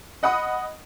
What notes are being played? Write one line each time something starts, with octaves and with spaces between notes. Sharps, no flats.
D#5 F#5 B5 D#6